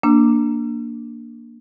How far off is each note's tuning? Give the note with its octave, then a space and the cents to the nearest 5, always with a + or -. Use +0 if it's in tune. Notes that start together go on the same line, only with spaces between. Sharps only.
A#3 +0 D4 +0 E6 +45